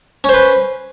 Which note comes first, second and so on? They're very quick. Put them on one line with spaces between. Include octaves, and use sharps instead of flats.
C#4 C5 B4